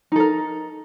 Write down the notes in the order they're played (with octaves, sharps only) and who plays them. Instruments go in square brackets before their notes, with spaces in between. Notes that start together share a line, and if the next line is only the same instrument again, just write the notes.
[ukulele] D#4
A4
A#4